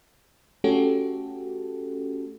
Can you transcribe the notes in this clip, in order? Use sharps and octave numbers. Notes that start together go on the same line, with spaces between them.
A3 C#4 F#4 G4 A4